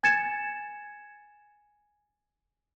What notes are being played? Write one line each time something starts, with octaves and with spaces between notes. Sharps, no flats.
G#5 G#6 A6 C#7 E7